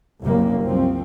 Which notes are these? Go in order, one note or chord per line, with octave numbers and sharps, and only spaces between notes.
F#1 C2 F#2 G3 A#3
C2 F3 C4